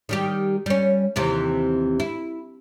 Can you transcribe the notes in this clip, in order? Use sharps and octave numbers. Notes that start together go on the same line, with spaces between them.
D#3 G3 G4
G3 C#4
D#2 C3 E3
E4